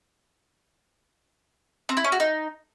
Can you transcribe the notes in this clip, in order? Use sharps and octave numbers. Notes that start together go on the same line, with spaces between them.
C4
E4
C#4
F#4
D#4